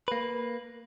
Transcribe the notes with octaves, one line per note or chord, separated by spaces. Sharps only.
A#3 B4